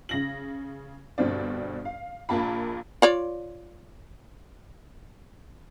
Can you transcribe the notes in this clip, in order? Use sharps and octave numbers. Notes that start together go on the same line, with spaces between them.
C#3 A#6 F#7
G1 G2 B2 C4 D5
F5
A#1 A#2 A#3 A5 B5
F4 C#5 D5